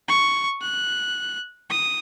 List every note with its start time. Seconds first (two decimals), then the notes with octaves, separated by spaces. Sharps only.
0.08 C#6
0.63 F#6
1.70 D#6